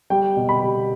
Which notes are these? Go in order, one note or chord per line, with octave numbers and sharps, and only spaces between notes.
G3 G5
B2
B5
G3